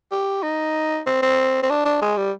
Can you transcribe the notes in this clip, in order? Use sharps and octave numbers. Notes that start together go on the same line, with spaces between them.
G4
D#4
C4
C4
C4
D4
D4
G#3
G3